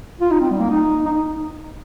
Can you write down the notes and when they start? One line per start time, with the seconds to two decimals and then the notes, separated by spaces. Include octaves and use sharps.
0.21 F4
0.31 D#4
0.41 C4
0.51 G3
0.60 A#3
0.71 D#4
1.06 D#4